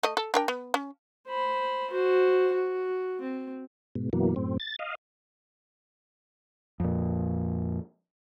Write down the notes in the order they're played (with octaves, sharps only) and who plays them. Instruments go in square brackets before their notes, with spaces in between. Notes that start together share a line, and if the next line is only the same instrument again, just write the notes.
[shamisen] A3 D#5
A4
D4 A#4 G5
B3
C#4
[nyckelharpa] C5 B5
F#4 C5
F#4
C4
[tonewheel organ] G#2 B2
F#2 B2 E3 F#3 A#3
F#2 A2 C4
A6
D#5 F5
[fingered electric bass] F2 A#2